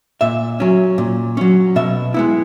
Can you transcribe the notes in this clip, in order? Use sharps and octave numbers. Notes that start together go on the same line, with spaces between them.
A#2 E5
F#3 C#4
A#2
F#3 C#4
B2 E5
G#3 B3 E4